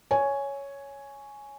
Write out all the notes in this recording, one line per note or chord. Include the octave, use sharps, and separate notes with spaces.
C#5 G#5